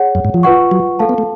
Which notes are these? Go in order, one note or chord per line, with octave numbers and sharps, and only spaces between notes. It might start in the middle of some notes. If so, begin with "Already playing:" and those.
Already playing: G#4 C#5 F#5
F#2
G#2
F3
F4 B4 F#5 C#6
F#3
A3 A4 F5 A5
B3
A3